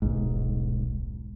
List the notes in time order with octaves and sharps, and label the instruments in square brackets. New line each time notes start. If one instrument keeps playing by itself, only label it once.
[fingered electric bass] D#1 B1 G#2